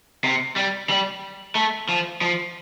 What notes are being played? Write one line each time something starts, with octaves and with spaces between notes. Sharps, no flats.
C3
G3
G3
A3
F3
F3